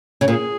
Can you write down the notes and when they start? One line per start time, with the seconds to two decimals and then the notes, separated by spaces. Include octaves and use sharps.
0.21 C#3
0.28 A#2 G#4